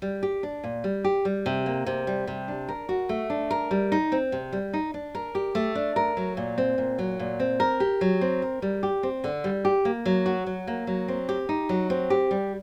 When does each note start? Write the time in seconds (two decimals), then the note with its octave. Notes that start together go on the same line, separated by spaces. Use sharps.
0.02 G3
0.23 G4
0.43 D4
0.64 A#2
0.84 G3
1.04 G4
1.25 G3
1.46 C3
1.66 A#3
1.86 C3
2.07 G3
2.27 C3
2.48 D4
2.68 A#4
2.89 F#4
3.09 A3
3.30 D4
3.51 A#4
3.71 G3
3.92 D#4
4.12 C4
4.32 C3
4.52 G3
4.73 D#4
4.94 D4
5.15 A#4
5.35 G4
5.55 A3
5.75 D4
5.96 A#4
6.17 F#3
6.37 A#2
6.58 C4
6.78 A#2
6.99 F#3
7.19 A#2
7.40 C4
7.60 A#4
7.80 G4
8.01 F#3
8.21 C4
8.42 A#4
8.62 G3
8.83 G4
9.03 C4
9.24 D3
9.44 G3
9.65 G4
9.85 A#3
10.06 F#3
10.26 F#4
10.46 F#3
10.67 A#3
10.87 F#3
11.08 C4
11.29 G4
11.49 D#4
11.69 F#3
11.90 C4
12.10 G4
12.31 G3